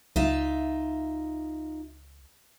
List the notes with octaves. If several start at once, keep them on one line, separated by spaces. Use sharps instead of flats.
C#2 D#4 F4 E5